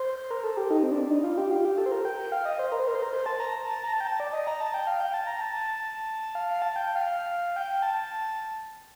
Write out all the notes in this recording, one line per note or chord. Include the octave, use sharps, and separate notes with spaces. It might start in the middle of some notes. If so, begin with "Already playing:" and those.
Already playing: C5
A#4
A4
G4
D#4
C4
D4
D#4
F4
G4
F4
G4
A4
C5
A#4
G5
G5
F5
D#5
C5
A#4
C5
A#4
C5
A#4
C5
A5
A#5
A5
A#5
A5
G5
A5
D5
D#5
A#5
A5
G5
F5
G5
A5
A#5
A5
A5
F5
F5
A5
G5
F5
G5
G5
A5